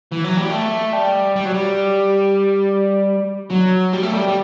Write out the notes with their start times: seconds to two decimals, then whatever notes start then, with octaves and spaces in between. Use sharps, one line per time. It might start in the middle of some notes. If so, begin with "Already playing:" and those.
0.12 E3
0.24 F#3
0.37 G3
0.50 A3
0.93 G3
1.36 G3
1.45 F#3
1.54 G3
3.50 F#3
3.93 G3
4.03 A3
4.13 G3
4.28 G3